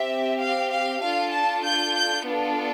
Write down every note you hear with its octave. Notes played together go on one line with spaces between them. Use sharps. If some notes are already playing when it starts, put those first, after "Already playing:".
Already playing: C4 G4 E5
F5
F5
D4 F4 A4 F5
A5
G6
G6
B3 D4 F4 A4